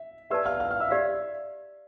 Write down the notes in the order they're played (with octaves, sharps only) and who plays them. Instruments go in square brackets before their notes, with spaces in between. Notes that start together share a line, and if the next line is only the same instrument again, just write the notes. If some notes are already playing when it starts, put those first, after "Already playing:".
Already playing: [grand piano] E5
[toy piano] G4 B4 D5 A5 [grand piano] E5 E6
[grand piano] F5 F6
F5 F6
F5 F6
E5 E6
[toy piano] G4 D5 F5